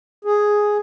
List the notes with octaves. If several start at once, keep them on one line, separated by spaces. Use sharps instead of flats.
G#4